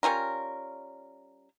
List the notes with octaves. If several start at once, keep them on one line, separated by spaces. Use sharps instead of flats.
G3 C#4 F4 A#4